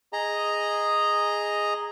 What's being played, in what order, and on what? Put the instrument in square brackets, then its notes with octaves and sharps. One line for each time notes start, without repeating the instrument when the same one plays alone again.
[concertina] G#4 D#5 A#5